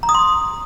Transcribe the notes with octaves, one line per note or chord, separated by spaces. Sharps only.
A#5
D#6
C6